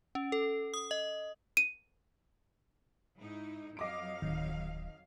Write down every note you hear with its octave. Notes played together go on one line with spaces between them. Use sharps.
C#4
A4
D#6
D#5
D#7
G#2 D#4 E4
F2 F#3 D#5 F5 D6 D7
D1 D#3